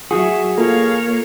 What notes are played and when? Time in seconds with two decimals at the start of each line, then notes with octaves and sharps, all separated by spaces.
0.11 F#3 F#4 G#4 E5
0.58 A#3 F4 A4 C#5 F5 A#5